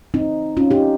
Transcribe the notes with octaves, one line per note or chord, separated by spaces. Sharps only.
C4 D#4
C#4 F4
D#4 G4